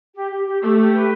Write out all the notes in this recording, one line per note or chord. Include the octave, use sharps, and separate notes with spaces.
G4
G4
G4
A3 G4
G4
B4